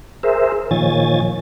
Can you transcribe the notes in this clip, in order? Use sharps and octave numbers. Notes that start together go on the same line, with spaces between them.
G#4 A#4 C5 E5
A#2 D#3 F3 C#5 G#5 A6